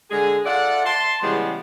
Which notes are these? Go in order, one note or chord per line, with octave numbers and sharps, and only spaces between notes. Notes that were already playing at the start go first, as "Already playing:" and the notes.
D3 G#3 G#4
F4 A4 D5 E5 F#5
A5 C6
C#3 E3 G3 G#3 B3